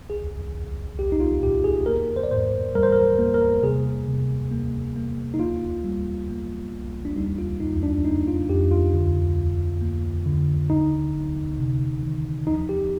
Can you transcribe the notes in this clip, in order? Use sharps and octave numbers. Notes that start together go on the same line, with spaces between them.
C2 G#4
C2
C2 G4
D#4
F4
A#2 G4
G#4
A#3 A#4
C5
D5
G#2 C5
G3 A#4
C5
A#4
A#3
A#4
C3 G#4
C3
A#3
A#3
D#4
A#3 F4
G3
A#3
C2
D4
G3 D#4
F4
F2 D#4
D4
A#3 D#4
F4
F2 G4
F4
D3
D#2
A#3
D3
G1 D#4
G1
C3
D#3
F3 D#4
G4